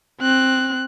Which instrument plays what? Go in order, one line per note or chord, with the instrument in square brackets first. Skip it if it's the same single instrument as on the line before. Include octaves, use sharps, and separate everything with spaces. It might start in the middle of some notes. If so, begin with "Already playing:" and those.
[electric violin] C4 F#6